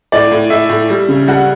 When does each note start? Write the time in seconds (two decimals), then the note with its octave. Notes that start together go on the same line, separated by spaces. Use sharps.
0.12 A2 D5
0.32 A2
0.50 A2 E5
0.70 A2
0.90 G3
1.09 C#3
1.28 G3 F#5